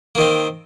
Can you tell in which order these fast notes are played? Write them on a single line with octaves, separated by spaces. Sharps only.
A#3 D#3 C4